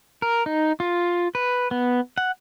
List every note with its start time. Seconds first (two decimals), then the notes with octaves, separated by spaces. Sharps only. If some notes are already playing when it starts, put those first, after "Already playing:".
0.22 A#4
0.46 D#4
0.80 F4
1.35 B4
1.71 B3
2.18 F#5